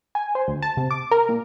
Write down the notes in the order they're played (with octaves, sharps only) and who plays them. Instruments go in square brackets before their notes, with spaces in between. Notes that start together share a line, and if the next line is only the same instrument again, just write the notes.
[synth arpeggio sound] G#5
C5
D2
A5
C3
D6
A#4
A#2